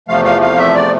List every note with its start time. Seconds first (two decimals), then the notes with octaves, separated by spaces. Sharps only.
0.08 E2 C3 F3 A3 F5
0.25 F5
0.42 F5
0.58 E5
0.74 D5